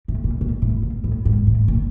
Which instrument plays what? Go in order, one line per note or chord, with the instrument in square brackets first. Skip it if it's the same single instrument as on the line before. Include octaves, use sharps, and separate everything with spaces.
[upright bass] A2
A#2
A#2
A2
A#2
A2
G#2
A2
A#2